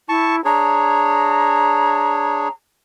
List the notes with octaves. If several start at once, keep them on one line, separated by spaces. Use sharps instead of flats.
E4 A5 C#6
D4 G#4 C#5 A#5